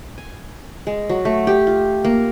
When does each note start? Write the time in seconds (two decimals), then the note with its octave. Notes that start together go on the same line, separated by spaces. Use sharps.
0.18 G#5
0.87 G#3
1.10 F#3
1.25 A3
1.47 G4
1.67 F4
2.05 A#3